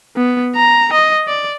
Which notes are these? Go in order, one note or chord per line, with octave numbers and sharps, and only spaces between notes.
B3
A#5
D#5
D5